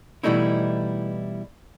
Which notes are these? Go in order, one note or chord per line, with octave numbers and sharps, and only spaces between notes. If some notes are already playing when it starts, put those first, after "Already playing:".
B2 E3 G3 A3 D#4 E4